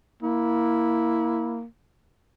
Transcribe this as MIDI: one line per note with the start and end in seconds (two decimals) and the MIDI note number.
0.23 1.66 58
0.23 1.59 64